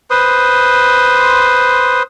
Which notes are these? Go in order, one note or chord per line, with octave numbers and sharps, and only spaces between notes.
B4 C5 C6 D#6